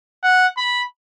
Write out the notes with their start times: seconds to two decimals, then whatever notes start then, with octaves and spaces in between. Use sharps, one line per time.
0.23 F#5
0.57 B5